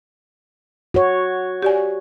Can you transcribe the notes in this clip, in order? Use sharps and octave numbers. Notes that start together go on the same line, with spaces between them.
F#4 C#5
G4 D5 G#5